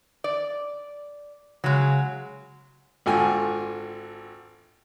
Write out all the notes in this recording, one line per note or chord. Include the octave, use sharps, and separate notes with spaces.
D5
C#3 F#3 G#3
G#1 D3 F4 G5 G#5